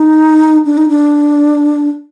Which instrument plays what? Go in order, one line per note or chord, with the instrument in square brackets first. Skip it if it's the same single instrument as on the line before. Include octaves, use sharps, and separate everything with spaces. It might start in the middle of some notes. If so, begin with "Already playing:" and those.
Already playing: [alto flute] D#4
D4
D#4
D4